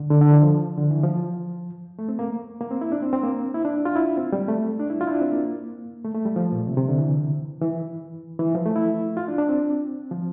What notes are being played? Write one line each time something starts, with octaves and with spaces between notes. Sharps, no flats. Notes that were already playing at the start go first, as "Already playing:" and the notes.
Already playing: D3
D3
D3
E3
F3
D3
E3
F3
A3
C4
A#3
A#3
C4
E4
D4
C4
C4
A#3
E4
D4
F4
E4
C4
G3
A3
D4
E4
F4
E4
D4
C4
A#3
A3
A3
G3
F3
A#2
C3
C3
D3
E3
E3
E3
F3
A3
E4
F4
D4
D4
C4
F3